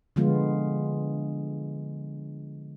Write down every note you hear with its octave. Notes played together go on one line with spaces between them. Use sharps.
D3 F3 G#3 B3 F4